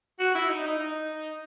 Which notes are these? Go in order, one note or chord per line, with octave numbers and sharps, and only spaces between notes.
F#4
E4
D#4
D#4
D#4